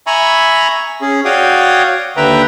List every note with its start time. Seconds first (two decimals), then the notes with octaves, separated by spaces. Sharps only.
0.07 E5 G#5 A#5 B5 C#6
1.01 C#4 G#4
1.25 F#4 C#5 D5 F5 G5 D#6
2.17 D#2 D3 B4 E5 G5 A#5